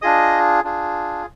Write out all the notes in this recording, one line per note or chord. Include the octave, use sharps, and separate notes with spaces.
D4 F4 G#4 D#5 D#6
D4 F4 G#4